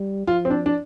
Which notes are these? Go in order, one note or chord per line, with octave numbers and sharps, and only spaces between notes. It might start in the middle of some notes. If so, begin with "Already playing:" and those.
Already playing: G3
F3 F4
C4
D4
D4